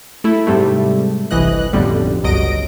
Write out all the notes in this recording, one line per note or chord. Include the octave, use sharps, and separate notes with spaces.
A3 E4
G#2 C3 G3 A3
G1 C2 E3 D#5 F#6
A1 F2 B2 D3 G3
G1 C#2 F#3 D#5 A#6 D7